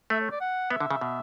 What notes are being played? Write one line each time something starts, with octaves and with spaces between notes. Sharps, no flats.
A3 E5
C#5
D5
F#5
B3 E5
D3
C#3
B2